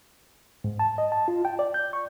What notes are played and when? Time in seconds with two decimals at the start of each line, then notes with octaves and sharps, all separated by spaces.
0.64 G#2
0.79 A5
0.98 D#5
1.12 A5
1.28 F4
1.45 G5
1.59 D5
1.74 G6
1.93 C#6